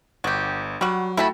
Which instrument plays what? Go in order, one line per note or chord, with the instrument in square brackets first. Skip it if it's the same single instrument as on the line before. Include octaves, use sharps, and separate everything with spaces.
[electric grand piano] G1 [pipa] F#4 G4
[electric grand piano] F#3 [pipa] G3 F#4
[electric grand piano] A3 F#4 G5 [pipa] E4 A5 B5